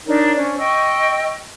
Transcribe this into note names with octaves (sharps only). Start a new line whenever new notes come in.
D4 D#4 A#4 C#5
C#4 D4 C5
D#5 G5 C#6 E6